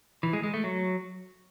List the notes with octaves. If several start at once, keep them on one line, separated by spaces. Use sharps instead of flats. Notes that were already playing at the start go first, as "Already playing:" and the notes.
E3
G#3
G#3
A3
F#3